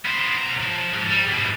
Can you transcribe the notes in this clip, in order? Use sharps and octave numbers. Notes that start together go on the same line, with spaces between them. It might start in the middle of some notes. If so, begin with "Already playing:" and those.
B3 C5
B1 A#5
F3
G#2
G3
G#2 B2